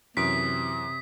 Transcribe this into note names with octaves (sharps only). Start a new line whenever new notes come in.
F#2 C3 E3 D#6 B6 D7